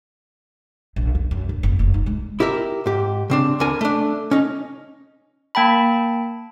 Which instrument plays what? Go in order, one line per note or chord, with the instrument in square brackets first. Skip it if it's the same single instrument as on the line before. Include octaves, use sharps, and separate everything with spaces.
[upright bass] A#1
E2
F#2
D2
F#1
F1
D#4
G#3
[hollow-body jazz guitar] E4 G4 A#4 E5
G#2 G4
C#3 C4 D4
D2 B3 D4 A#4 G#5
A3 D4
C#4 D#4
[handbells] A#3 G5 A5 B5